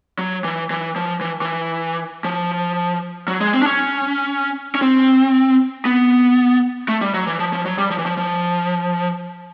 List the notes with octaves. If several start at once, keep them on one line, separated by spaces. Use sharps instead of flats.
F#3
E3
E3
F3
E3
E3
F3
F#3
G#3
C4
D4
C#4
C#4
C4
B3
A3
G3
F#3
E3
F3
F3
F#3
G3
F3
E3
F3
F3